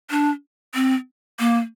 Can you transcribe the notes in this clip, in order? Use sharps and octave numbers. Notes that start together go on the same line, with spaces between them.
D4
C4
A#3